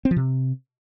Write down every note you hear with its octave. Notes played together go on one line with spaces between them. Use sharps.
C4
F3
C3